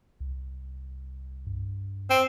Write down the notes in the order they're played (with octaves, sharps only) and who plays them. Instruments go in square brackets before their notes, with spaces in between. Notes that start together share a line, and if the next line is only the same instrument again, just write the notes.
[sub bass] C2
G2
[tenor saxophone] C4